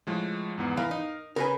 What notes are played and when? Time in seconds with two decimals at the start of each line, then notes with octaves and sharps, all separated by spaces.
0.07 A2 F3 G#3
0.58 E2 G#2 B3
0.77 E3 A#4 F5
0.91 D#4
1.36 C#3 A#4 B4 G#5